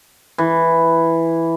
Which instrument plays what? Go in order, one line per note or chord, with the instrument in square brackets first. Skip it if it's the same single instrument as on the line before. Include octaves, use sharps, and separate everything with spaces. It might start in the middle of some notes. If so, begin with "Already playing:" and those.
[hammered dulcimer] E3